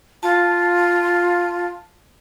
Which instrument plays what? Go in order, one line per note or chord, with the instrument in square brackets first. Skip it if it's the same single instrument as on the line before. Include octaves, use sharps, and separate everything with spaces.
[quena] F4 [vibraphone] A5